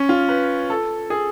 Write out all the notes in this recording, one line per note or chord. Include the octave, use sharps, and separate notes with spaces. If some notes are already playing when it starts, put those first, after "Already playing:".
Already playing: C#4
F4
B4
A4
G#4